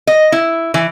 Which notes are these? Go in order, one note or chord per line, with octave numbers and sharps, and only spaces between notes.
D#5
E4
E3